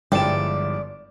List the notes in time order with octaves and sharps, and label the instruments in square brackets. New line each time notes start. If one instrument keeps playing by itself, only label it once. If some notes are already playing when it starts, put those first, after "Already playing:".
[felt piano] G1 E7 [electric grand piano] F3 G#3 E4 [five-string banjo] G3 G5 [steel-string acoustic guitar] D5